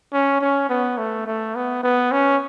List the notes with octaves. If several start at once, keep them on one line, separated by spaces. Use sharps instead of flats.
C#4
C#4
B3
A3
A3
B3
B3
C#4